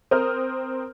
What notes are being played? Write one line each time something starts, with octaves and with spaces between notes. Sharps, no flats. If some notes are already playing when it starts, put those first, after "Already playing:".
C4 A#4 C5 D#6 F6 G6